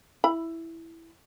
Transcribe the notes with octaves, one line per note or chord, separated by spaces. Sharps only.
E4 B5